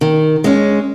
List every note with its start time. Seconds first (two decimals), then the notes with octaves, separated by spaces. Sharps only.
0.01 D#3
0.44 G#3 C#4